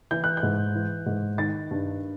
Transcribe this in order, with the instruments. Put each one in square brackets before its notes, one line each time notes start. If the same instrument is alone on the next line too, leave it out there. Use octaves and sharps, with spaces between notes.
[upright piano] E3 G6
F#6
G6
G#2
E3
G#2
D#3 A6
G2